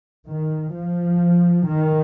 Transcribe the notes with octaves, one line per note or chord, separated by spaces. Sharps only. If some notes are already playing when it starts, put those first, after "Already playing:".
D#3
F3
D#3